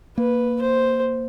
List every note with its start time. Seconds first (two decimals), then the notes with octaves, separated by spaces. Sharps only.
0.17 A#3 B4
0.62 C5